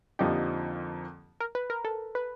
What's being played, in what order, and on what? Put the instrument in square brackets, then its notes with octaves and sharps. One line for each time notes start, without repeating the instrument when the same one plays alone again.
[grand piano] F2 D3 F3 A#3 D#4 [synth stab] G4
[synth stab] A#4
B4
A#4
A4
B4